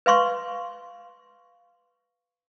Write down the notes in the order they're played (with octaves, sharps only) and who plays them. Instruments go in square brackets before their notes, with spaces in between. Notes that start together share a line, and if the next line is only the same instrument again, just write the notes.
[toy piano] B4 F5 C6 C#6